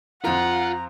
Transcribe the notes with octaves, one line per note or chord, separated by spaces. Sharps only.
F2 F3 F4 F#5 A#5